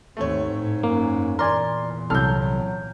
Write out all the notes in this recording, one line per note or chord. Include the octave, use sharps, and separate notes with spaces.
D#2 G#2 A3 C4 C#5
A2
F#2 A#3
E2 A#2 A#4 D5 G#5 C6
C2 F#3 A4 F6 G6
F#3